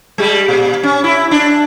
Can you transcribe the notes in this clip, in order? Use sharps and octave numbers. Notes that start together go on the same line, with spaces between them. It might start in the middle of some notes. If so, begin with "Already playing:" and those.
G3 G#3
A#2
C#4
E4
D4